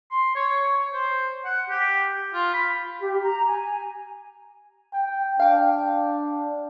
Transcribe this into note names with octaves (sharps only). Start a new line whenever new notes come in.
C6
C#5
C5
F#5
G4
F4
B5
G4
A#5
G#5
G5
D4 F5 G5